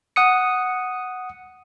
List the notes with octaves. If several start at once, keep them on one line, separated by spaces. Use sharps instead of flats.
F#5 D#6 C#7